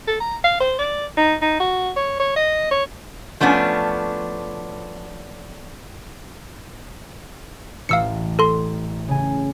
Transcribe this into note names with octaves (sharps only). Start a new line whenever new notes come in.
A4
A#5
F5
C5
D5
D#4
D#4
F#4
C#5
C#5
D#5
C#5
F3 A3 B3 C#4 D4
A1 F5 E6 C#7
A4 C6
C#3 G#5